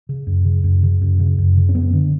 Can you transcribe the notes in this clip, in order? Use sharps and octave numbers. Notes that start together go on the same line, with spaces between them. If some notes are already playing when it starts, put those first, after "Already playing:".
C#3
F#2
C#3
F#2
C#3
F#2
C#3
F#2
C#3
C#4
F#2 B3
D3